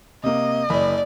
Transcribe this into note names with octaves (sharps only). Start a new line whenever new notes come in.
C3 A#3 D#5
F#1 D5 B5